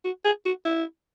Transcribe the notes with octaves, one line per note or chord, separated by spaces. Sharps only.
F#4
G#4
F#4
E4